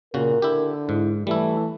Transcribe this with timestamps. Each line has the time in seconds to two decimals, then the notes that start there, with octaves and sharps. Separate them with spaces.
0.14 A#2 C#3 F#4 A#4
0.42 D3 E4 G4
0.89 G#2 E4
1.27 E3 G3 A3 E4